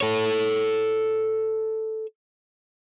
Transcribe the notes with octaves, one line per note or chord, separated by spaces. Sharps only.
A4 C#5